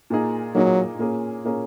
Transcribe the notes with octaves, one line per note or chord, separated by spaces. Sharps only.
A#2 A#3 D#4 G#4
A#2 F#3 A#3 D#4 G#4
A#2 A#3 C#4 G#4
A#2 A#3 C#4 G#4